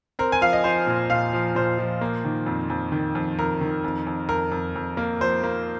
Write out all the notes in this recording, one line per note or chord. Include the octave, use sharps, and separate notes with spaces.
C4 A#4
G#5
F3 F5
D#5
F3 C5
A#2
A#2 F5
F3
A#2 C5
F3
A#3
D#3
F2
F2
D#3
F2
F2 A#4
D#3
F2
F2
F2 A#4
F2
F2
A#3
F3 C5
A#3